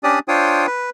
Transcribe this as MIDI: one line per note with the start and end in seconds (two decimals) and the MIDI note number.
0.04 0.19 61
0.04 0.19 62
0.04 0.19 67
0.04 0.19 74
0.04 0.19 87
0.28 0.67 62
0.28 0.67 65
0.28 0.67 72
0.28 0.67 73
0.28 0.67 79
0.28 0.67 87
0.67 0.90 71